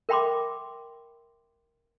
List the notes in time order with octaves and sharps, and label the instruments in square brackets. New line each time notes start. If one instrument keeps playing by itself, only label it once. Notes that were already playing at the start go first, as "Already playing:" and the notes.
[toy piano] A#4 E5 G5 B5 C6 D6